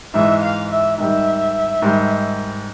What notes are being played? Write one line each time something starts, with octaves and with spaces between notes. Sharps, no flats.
G#2 E3 G#3 E5
F5
E5
G#2 D#3 G3 E5
G#2 D#3 G3